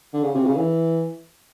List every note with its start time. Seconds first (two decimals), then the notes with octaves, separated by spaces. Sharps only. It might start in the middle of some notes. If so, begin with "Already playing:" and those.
0.13 D3
0.23 C#3
0.35 C3
0.46 C#3
0.56 E3